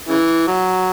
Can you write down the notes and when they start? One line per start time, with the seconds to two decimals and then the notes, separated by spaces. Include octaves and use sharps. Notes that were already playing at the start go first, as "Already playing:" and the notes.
0.09 C#3 E3
0.47 F#3